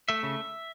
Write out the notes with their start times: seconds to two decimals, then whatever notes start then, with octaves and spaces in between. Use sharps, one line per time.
0.09 A3 E5
0.23 C#3